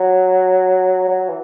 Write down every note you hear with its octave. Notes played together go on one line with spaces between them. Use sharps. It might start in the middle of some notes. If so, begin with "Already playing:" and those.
Already playing: F#3
F#3
E3